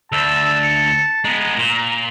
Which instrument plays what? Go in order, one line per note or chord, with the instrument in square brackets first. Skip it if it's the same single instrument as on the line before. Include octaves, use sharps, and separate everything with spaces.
[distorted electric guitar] D2 [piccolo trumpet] A5 [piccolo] E6
[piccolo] C#7
[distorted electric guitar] G#3 B3 [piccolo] A#5
[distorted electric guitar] A#2